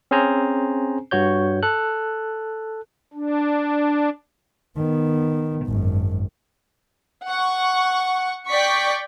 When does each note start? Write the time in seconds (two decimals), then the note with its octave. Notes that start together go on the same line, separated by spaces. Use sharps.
0.11 C4 C#4 G#4 C5 G#5 A#5
1.11 G2 F#4 C#5 G6
1.63 A4 F#6
3.13 D4
4.77 D#3 B3
5.66 G#1 F#2
7.26 F#5 C#6
8.49 D5 G5 C#6 B6